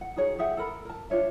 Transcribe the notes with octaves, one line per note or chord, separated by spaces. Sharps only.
F#5
D#4 F#4 G#4 C#5
G4 G#4 E5 F#5
A4 A#4 B5
A#4 A5
D4 F4 C#5 E5